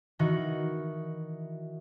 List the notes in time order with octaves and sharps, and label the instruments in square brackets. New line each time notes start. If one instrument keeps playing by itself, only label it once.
[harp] D#3 E3 D#4 F#4